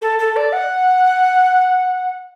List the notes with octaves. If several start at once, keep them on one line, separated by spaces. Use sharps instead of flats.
A4
A4
D5
F#5